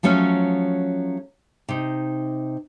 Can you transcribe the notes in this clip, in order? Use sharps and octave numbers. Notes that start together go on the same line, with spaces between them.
F3 F#3 A3 C#4
C3 D#4